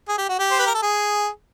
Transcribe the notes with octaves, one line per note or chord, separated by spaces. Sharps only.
G#4
G4
F#4
G4
C5
B4
A#4
A4
G#4